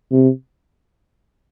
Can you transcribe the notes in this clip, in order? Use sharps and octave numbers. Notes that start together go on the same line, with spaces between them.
C3